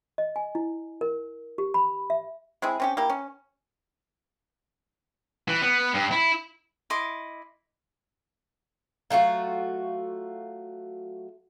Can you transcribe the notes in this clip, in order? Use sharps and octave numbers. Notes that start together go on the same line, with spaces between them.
D#5
G#5
E4
A#4
G4
B5
E5
G#3 C4 E4 G#4
C4 C#4 G4
A#3 E4 G4
C#4
E3
B3
G2
E4
E4 D#5 C6 D6
F#3 A3 F4 F#4